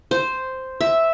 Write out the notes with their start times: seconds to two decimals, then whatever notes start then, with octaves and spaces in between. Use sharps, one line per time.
0.11 C5
0.81 E5